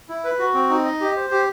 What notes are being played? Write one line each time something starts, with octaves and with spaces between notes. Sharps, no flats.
E4
B4
F#4
C4
D#4
D#5
G4
C5
G4